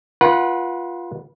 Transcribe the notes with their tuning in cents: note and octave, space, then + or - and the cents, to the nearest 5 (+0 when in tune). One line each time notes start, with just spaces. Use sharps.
F4 +0 B4 -30 F#5 +0